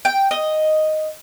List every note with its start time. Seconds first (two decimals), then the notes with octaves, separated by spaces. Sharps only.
0.05 G5
0.31 D#5